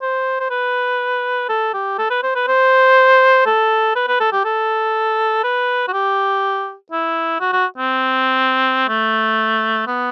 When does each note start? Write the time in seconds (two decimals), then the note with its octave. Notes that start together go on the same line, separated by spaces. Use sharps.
0.02 C5
0.40 C5
0.50 B4
1.49 A4
1.74 G4
1.98 A4
2.10 B4
2.23 C5
2.35 B4
2.48 C5
3.46 A4
3.95 B4
4.08 B4
4.20 A4
4.33 G4
4.45 A4
5.44 B4
5.88 F#4
5.93 G4
6.92 E4
7.41 F#4
7.53 F#4
7.78 C4
8.89 A3
9.87 B3